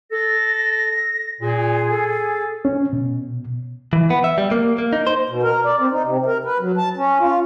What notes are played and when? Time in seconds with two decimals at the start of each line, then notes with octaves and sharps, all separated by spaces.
0.12 A4 A#6
1.41 A#2 G#4
1.90 A4
2.65 C#4
2.93 B2
3.93 E3
4.10 B3
4.24 E5
4.38 G3
4.51 A#3
4.78 A#3
4.93 D#4
5.07 C5
5.27 B2
5.43 A#4
5.64 D5
5.79 C4
5.91 D#4
6.04 C3
6.26 A#4
6.45 B4
6.60 F#3
6.77 A5
6.97 C#4
7.20 F4